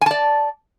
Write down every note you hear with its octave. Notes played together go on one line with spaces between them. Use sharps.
D5 G#5 A5